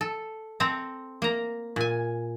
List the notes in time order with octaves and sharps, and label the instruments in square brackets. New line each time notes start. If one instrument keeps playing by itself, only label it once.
[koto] A4
C4 A4 A#5
A#3 A#5
A#2 G#5